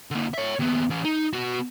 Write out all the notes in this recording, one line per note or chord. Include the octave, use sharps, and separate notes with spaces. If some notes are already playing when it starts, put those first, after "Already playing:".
D3 A#3
C#5 E5
D#2 B3
E3 C#4
D#4
B3 F#4